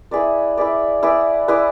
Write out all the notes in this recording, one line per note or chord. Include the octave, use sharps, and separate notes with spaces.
E4 G#4 B4 D5
E4 G#4 B4 D5
E4 G#4 B4 D5
E4 G#4 B4 D5